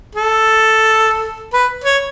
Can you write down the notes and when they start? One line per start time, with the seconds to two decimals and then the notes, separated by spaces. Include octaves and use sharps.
0.16 A4
1.53 B4
1.84 C#5